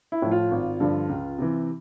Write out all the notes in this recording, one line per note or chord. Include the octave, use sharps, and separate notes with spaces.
E4
A2 F3
F4
G#1
G2 D3 F3
C#2
C3 E3